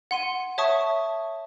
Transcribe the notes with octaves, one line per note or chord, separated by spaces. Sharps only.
F#5 C6 D#7
C#5 E5 A5 C#6 D#6